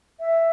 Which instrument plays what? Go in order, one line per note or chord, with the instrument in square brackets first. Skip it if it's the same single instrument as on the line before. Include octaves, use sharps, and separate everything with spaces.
[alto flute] E5